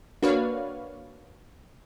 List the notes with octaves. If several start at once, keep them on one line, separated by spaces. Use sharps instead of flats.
A#3 D4 F#4 B4 C#5 F5